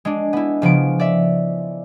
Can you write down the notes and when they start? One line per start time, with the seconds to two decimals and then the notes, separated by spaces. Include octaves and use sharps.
0.05 G#3 D4
0.33 B3 E4
0.62 C#3 F3 B3 D7
1.00 D5 E5